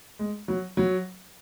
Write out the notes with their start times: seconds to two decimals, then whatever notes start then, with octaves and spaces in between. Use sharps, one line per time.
0.19 G#3
0.48 F#3
0.77 F#3